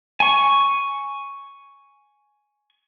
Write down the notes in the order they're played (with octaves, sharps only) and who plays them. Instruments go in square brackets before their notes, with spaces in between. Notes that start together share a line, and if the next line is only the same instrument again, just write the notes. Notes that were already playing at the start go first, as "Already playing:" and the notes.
[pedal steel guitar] G#5 C#6